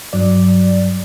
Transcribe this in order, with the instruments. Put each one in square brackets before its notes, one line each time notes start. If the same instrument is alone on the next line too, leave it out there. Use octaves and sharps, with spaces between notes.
[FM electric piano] G2 F#3 D5